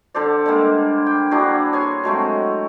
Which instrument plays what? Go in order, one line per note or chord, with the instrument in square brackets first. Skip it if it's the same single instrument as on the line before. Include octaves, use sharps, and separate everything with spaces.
[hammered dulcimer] D3 A4 C5 D5
D3 G3 G#3 A#3
G5
D4 E4 F#4 G#4
C#5 G#5 C6
F#3 G#3 A3 C4